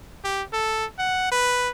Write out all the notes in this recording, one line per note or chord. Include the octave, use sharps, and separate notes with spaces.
G4
A4
F#5
B4